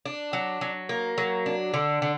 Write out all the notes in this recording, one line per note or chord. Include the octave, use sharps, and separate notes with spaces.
D4
F#3
F#3
A#3
F#3
D4
D3
D3